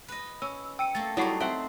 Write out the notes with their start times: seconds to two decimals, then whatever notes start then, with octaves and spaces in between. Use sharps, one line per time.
0.08 B4 D#5
0.42 C#4 E6
0.79 G5 E6 C#7 D#7
0.95 A3 A#3 A6
1.17 F#3 G3 A3 D#4 E4 F#4 C7
1.40 C4 E5 F#5 G5